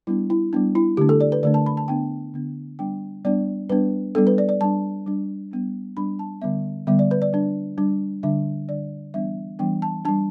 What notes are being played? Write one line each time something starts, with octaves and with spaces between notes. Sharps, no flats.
G3 B3 D4 E4
E4
G3 B3 D4
E4
D3 A3 D4 G4
A4
D5
B4
D3 A3 D4 D5
A5
B5
A5
D3 B3 D4 G5
D3 B3 D4
G3 B3 D4 G5
G3 B3 D4 D5
G3 B3 D4 B4
G3 B3 D4 A4
B4
D5
D5
G3 D4 A5
G3 D4
G3 B3 D4
G3 B3 D4 B5
A5
D3 G3 B3 E5
D3 G3 B3 E5
D5
B4
D5
G3 D4
G3 D4
D3 G3 D4 E5
D3 G3 D4 D5
E3 G3 B3 D4 E5
E3 G3 B3 D4 G5
A5
G3 D4 A5